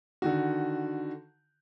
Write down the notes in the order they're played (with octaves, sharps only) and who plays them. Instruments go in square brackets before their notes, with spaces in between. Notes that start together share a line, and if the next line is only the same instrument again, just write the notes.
[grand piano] D3 D#3 F#4